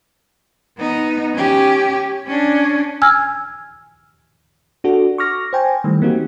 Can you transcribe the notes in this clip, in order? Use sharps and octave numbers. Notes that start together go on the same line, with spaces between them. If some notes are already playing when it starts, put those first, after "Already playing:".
B3 D#4
C#4 G4
C#4 D4
G#5 E6 F6 G#6
D4 F#4 A4
C#6 D6 F6 A#6
C5 G5 G#5
D#3 E3 G3 A3
A#3 C4 D#4 F#4 G4